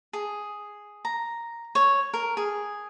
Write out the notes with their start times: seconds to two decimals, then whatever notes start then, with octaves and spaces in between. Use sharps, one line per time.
0.13 G#4
1.05 A#5
1.75 C#5
2.13 A#4
2.37 G#4